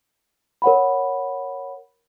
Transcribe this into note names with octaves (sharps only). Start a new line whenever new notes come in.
A#4 C#5 F#5 B5